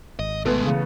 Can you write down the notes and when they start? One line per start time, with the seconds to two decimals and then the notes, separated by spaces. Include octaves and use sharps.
0.19 G#1 D#5
0.45 B2 G#3 A3 B3
0.63 C#3 E3 C#4